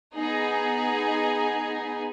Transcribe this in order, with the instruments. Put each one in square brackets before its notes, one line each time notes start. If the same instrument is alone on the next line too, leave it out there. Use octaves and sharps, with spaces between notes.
[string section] B3 D#4 G#4